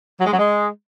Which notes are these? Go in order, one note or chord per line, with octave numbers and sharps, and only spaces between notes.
F#3
G#3
F#3
G#3